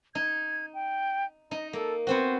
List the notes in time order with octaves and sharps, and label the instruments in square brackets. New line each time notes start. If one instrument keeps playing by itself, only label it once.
[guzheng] D#4 [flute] G#6
[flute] G5
[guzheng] D#4 [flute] D#5
[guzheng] A#3 [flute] A4
[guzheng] B3 C4 F#4 [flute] C5